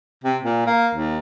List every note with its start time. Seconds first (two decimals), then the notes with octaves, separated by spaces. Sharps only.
0.24 C3
0.43 A#2
0.66 A#3
0.94 D#2